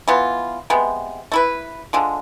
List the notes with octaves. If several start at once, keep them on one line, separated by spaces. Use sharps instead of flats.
E3 B3 F4
C3 G#3 B3
A3 E4 B4
D3 F3 G#3